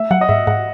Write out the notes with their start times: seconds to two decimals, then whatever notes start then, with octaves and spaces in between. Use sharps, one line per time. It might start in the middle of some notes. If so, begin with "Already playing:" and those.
Already playing: A3 E5
0.11 F#3 F#5
0.21 D#5
0.29 G#2 E5
0.47 G#2 F#5